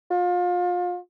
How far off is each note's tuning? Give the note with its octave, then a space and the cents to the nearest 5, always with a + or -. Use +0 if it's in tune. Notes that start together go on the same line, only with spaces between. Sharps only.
F4 +30